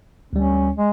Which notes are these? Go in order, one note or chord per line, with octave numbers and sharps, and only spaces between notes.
D2 G3 C#4
G#3